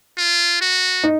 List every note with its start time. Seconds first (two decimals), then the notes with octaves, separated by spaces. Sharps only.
0.17 F4
0.61 F#4
1.04 D#4